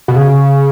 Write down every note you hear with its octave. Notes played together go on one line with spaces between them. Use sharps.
B2
C#3